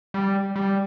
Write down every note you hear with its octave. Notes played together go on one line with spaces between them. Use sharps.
G3
G3